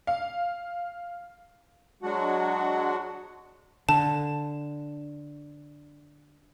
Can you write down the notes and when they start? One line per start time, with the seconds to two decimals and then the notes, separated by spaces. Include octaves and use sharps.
0.07 F5
2.03 F#3 G#3 D4 F#4 F#5
3.89 D3 A5